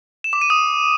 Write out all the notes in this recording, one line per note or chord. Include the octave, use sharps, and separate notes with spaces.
E7
D6
D#7
D#6